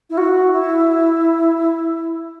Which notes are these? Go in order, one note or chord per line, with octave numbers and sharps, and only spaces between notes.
E4
F#4
E4